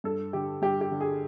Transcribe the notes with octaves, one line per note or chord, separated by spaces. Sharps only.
G2 A4
D3 G4
G2 G4
G4
D3
G#4